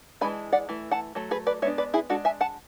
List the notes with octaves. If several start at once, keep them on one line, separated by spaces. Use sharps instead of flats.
E3 G#3 D4 G#5 B5
D5 F#5
E3 A3
F#5 A5
F#3 A3
G#4 B4
B4 D5
G#3 B3 D4 C#5 E5
B4 D5
E4 G#4
G#3 D4 F#4 A4
E5 G#5
F#5 A5